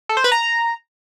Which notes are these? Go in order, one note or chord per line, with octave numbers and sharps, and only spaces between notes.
A4
C5
B4
A#5